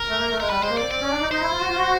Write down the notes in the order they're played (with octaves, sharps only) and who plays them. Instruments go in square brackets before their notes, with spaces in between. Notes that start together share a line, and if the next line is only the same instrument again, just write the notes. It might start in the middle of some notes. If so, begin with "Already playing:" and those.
Already playing: [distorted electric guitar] A#4
[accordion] A3
A#3
A3
[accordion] G#3 [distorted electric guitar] A#4
[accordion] G3 [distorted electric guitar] B4
[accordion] G#3 [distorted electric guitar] C5
[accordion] A#3
[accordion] C4 [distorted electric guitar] D5
[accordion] C4 [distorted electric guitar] D5
[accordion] C#4
D4
D#4
[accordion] D#4 [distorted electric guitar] C5
[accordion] E4
F4
F#4
F4
F#4